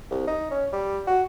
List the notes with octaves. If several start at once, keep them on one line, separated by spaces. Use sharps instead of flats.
C2
D#4
C#4
G3
F#4